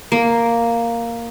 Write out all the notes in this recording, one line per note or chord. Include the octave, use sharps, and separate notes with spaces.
A#3